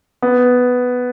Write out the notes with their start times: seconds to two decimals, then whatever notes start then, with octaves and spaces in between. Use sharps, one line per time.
0.22 B3